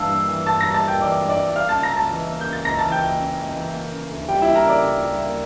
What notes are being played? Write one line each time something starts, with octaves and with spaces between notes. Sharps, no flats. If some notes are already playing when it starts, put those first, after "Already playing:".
Already playing: G2 E3 G3 A#3 F5 A5 E6
A#3
E3
G2 A5 A6
A#5 A#6
G3
A5 A6
A#3
G5 G6
E3 D5 D6
G2
D5 D6
G3
A#3 F5 F6
A5 A6
C#3
A#5 A#6
C#2 A5 A6
E3
A#3
G6
C#3
A6
C#2 A#5 A#6
A5 A6
E3
G5 G6
A#3
C#3
C#2
E3
A#3
C#3
D2
G3 G4 G5
E4 E5
A#3
A#4 A#5
C#3 D5 D6
D2
G3
A#3